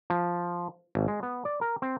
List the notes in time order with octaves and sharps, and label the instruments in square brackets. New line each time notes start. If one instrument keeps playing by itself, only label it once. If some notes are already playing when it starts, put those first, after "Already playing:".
[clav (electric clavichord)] F3
G#1
G#3
B3
D5
A#4
C4